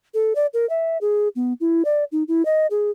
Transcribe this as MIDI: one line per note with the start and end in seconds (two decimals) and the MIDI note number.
0.14 0.33 69
0.35 0.46 74
0.54 0.68 70
0.69 0.97 76
1.01 1.28 68
1.36 1.53 59
1.60 1.83 64
1.85 2.04 74
2.12 2.23 63
2.28 2.45 64
2.45 2.67 75
2.70 2.90 68